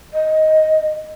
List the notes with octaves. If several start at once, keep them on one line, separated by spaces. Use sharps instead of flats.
D#5